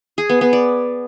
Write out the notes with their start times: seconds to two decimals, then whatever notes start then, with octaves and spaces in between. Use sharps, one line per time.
0.18 G#4
0.29 B3
0.41 B3
0.53 D5